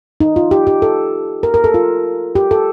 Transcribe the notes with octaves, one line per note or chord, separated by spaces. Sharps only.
D#4
F4
G4
G4
A4
A#4
A#4
A4
F4
G4
A4